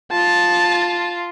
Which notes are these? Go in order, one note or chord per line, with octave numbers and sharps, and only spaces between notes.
F4 A5